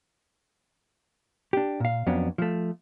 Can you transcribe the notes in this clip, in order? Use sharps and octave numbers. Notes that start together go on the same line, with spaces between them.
D4 G4
A#2 F5
F2 F#3 B3 C#4 D4
F3 A3